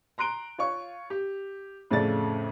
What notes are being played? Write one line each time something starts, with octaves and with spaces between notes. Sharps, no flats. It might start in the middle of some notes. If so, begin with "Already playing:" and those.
A#5 C6 F#6 D7 G7
F4 C#5 C#6
G4
F2 A2 C#3 A3 D5 A6